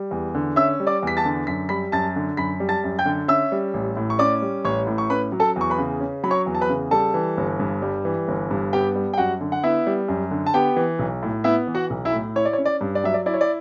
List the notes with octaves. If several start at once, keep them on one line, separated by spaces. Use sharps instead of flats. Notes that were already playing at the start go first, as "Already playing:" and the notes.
Already playing: G3
E2
D3
C#4 E5 E6
G3
D5 D6
E2 B6
A5 A6
D3
F#2 B6
G3 B5 B6
F#2 A5 A6
D3
F#2 B5 B6
G3
A5 A6
F#2
G5 G6
D3
C#4 E5 E6
G3
A1
A2
C#6
C#4 D5 D6
G3
A1 C#5 C#6
A2
C#6
C#4 B4 B5
F#3
A4 A5
E2 C#6
B4 B5
C#3
C#4
F#3 B5
C#5 C#6
E2
A5
B4 B5
C#3
G3 A4 A5
E3
G1
G2
G3
E3
G1
G2
B3 G4 G5
G3
G5
F#2 F#4 F#5
D3
F#5
B3 E4 E5
G3
F#2
D3
A5
B3 G4 G5
E3
B1
A2
B3 E4 E5
E3
F#4 F#5
B1
E4 E5
A2
E4 C#5
D5
C#5
C#4
D5
G2
D5
F#3 E5
D5
E4 D5
C#5
D5